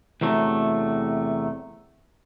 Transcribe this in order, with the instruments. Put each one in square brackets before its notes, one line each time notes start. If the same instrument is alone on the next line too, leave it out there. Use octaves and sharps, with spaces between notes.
[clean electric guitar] E2 C3 F#3 A3